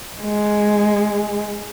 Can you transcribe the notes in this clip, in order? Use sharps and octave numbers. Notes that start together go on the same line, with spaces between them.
G#3